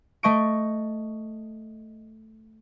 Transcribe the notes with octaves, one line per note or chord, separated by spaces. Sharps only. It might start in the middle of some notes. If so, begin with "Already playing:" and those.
A3 D#5 C#6 D7